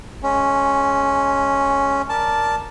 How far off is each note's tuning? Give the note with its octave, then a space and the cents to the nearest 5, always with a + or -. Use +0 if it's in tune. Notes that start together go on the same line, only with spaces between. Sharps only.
G#3 +20 C#4 +0
A#4 +0 D5 +0 A5 -5